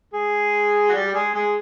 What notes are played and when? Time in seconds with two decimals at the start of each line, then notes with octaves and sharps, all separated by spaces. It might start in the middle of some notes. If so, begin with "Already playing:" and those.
0.13 G#3 G#4
0.89 F#4
0.94 G3 G4
1.08 G4
1.14 G#3 G#4
1.34 G#3 G#4